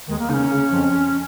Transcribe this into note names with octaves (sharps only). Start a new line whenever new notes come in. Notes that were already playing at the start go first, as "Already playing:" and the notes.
D#2 D#3 G#3
A#3
C#3 D#4
C#4
C#3
F2 F3